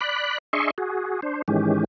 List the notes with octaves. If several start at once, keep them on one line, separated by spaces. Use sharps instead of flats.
D5 B5 F#6
D4 G#4 D#5 E5 C6 C#6
F#4 G#4
D4 C5
G#2 D#3 E3 G#3 C#4 G4